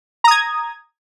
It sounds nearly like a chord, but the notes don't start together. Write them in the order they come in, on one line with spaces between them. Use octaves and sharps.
A#5 D#6 G#6